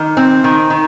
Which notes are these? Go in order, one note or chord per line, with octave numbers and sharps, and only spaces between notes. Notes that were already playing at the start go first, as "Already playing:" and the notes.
Already playing: D#3
C4
D#3
D#3